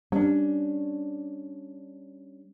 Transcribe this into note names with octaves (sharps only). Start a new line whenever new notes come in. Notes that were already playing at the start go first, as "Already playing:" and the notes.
G3 C#4 D4